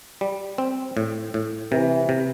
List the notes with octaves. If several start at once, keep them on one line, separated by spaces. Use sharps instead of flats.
G3
C4
A2
A2
C3 E3
C3